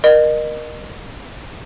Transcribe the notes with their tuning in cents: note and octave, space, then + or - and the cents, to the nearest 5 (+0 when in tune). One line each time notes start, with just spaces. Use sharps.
A#4 +20 D#5 -35